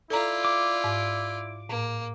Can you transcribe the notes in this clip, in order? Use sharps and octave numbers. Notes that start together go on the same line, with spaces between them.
E4 F4 A4 D5 A#5
D6
G#2
A2 A#3